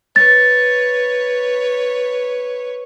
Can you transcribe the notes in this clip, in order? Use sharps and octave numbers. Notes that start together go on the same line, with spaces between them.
B4 C#5 A6